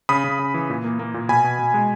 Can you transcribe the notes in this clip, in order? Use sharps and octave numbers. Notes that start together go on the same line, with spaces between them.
C#3 B5 D#6
C#3
C#3
E3
A#2
A#3
A#3
A#2
B2 G#5 B5
B2
B2
G#3